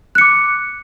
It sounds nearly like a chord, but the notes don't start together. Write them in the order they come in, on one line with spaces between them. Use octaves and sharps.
F#6 C#7 D6